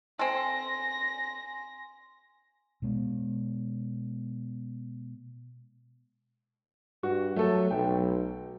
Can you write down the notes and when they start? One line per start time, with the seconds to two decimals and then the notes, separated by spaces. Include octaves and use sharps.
0.19 C4 A4 G#5 C6 A#6
2.82 B2 G#3 B3
7.03 G2 F#4
7.36 F#3 A3 A4
7.71 B1 G5